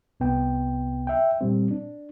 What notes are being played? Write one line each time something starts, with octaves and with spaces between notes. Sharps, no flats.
C2 C3 B3 G5
E5 G5
A#2 G3 C4
D4